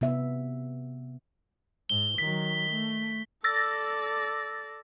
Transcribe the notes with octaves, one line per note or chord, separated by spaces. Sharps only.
C3 B3 E5
G#2 G7
D#3 F#3 B6
A3
A4 D5 E6 A6 A#6